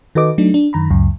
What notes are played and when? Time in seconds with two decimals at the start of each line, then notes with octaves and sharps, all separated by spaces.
0.15 D#3 F#4 A4 B4 D#5 D6
0.38 F#3 A3 D4 D#4
0.54 D4
0.73 F#2 D#3 A#5 B5
0.90 C#2 F#2